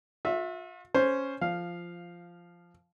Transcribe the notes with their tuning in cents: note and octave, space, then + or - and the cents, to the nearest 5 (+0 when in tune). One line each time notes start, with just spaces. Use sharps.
F4 +45 E5 +0
C#4 +0 C5 +0
F3 -10 F5 +0